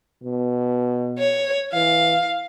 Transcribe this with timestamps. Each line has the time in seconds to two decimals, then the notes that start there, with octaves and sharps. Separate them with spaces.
0.24 B2
1.19 C#5
1.73 E3 F5